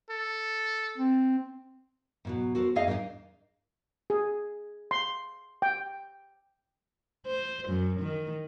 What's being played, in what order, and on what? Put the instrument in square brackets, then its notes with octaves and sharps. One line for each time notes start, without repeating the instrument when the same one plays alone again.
[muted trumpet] A4
[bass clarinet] C4
[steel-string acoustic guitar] G#2 B2 F#3
F#4 A4 A#4 C5
F2 A3 D#4 G#4 D#5 F5
G#2 A#3 B3 D4 D#4
[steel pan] G#4
C6
G5
[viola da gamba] C5
F#2
D#3